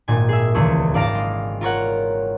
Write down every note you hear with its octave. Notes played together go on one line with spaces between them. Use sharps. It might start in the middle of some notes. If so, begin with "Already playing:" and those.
G#1 A#2 G#5
G#4 E5
D#1 C#2 E3 A3 G#4 C#6
G#1 D5 F5 A5 A#6 D7
G#3
F4 A#4 C#5 F#5